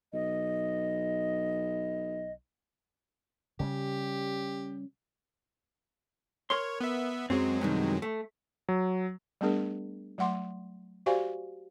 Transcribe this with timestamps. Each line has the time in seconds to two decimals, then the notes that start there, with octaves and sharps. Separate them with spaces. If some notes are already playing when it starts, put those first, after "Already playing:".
0.13 B1 D#5
3.60 C#3 G3 G4
6.50 A#4 C#5 C6
6.81 B3 E5
7.30 F#2 F#3 G#3 C4
7.61 G2 C3 D#3
8.02 A3
8.69 F#3
9.41 G3 A3 B3 D4 G#4 A#4
10.18 F#3 A3 F#5 C6 D6
11.06 F#4 G4 C5 D5 F5 G#5